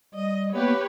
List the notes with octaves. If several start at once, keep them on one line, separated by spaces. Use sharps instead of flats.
G3 D#5
A#3 B3 G4 B4 C#5